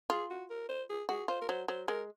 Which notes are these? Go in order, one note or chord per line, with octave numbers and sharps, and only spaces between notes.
F4 G#4
F#4
A#4
C5
G#4
F#4 G#4
F4 C5
A#4
F#3 C5
F#3 C5
G#3 A#4